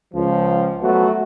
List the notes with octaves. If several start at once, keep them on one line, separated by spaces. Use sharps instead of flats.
C#2 F3
F#3 A3 B3 F#4